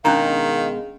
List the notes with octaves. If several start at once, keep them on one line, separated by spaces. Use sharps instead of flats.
B2 D#3 G#3 C#4 D4 G#4 F5 A#5